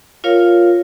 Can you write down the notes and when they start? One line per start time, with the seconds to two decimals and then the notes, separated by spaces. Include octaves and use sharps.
0.24 F4 A#4 C#5 F5